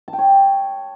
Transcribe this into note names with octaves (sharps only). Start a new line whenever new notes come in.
A5
G5
C#5